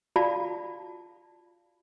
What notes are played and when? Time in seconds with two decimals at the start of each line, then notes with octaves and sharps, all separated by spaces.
0.16 F4 F#4 D5 F5 A5 B5